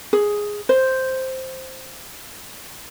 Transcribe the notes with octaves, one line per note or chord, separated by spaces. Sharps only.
G#4
C5